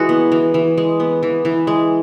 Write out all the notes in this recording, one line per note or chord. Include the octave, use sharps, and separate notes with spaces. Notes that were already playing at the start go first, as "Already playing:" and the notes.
Already playing: E3 G#3 E4 F#4 G#4
B3
E3
E3
G#3
B3
E3
E3
G#3